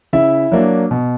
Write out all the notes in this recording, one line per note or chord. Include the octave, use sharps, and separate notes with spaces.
C#3 E4 E5
F#3 A#3 D4
B2